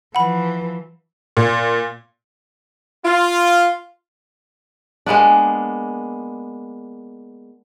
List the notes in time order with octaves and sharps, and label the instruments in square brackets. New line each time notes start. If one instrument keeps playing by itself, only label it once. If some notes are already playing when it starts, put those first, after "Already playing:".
[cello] E3 F3 [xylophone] F#5 B5
[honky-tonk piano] A#2
[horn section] F4
[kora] G#3 A#3 B3 D4